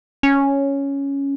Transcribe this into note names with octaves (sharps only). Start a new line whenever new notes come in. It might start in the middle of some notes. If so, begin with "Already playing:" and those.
C#4